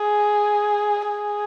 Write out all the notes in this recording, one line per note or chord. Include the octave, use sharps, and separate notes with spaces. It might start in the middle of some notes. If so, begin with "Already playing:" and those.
Already playing: G#4
G#4